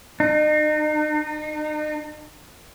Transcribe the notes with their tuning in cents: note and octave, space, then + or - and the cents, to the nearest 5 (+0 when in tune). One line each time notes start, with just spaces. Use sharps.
D#4 -40